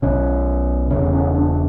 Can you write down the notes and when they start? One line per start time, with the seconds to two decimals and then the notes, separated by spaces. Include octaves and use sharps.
0.02 B1 B2 C#4
0.90 E1 E2 C#3 C#4
1.13 C#4
1.34 D4